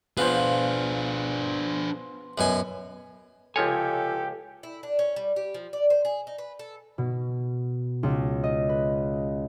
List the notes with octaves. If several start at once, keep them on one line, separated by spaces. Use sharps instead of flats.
B3 D4 F4 G#4 C5
F#2 B2 G#5
C#2 F3 F4 G4 A4 C#5 G#5
E4
D4
C#4
G3
G4
F3
D5
C5
G#4
D#4
B4
A4
B2
C#2
D#5
B4